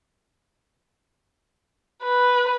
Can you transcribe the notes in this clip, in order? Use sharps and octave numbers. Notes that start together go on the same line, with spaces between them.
B4